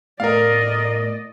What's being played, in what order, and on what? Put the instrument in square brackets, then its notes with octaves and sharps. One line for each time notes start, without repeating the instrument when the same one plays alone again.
[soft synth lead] A2 [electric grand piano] A#4 F5 [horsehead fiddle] D5 D#5